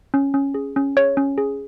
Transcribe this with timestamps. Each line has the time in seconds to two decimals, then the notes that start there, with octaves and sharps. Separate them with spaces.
0.14 C#4
0.34 C#4
0.54 G#4
0.76 C#4
0.97 G#4 C#5
1.17 C#4
1.38 G#4